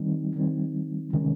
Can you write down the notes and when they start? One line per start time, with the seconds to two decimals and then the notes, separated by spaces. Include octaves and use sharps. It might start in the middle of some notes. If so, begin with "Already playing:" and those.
Already playing: D#3 G3 C4 D#4
0.36 D#3 G3 C4 D#4
1.13 C3 D#3 G#3 C#4